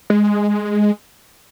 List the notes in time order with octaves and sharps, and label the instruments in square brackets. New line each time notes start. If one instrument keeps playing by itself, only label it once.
[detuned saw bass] G#3